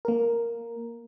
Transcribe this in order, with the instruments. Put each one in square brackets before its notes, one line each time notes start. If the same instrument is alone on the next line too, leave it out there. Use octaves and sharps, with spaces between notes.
[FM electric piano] A#3 A#4